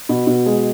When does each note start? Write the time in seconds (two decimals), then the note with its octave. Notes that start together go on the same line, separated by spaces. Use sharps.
0.09 B2
0.27 B2
0.46 G#3